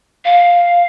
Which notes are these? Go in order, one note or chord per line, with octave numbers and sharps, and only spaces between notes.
F5